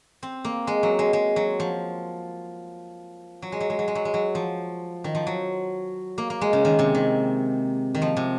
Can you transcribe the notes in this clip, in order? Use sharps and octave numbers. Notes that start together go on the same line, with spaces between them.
C4
A#3
G#3
F#3
G#3
G#3
F#3
F3
F#3
G#3
F#3
G#3
F#3
G#3
F#3
G#3
F#3
F3
D#3
F3
F#3
A#3
A#3
G#3
C#3
D#3
C3
D#3
D#3
F3
C3